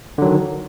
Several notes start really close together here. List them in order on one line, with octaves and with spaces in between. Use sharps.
D3 F#3 D#3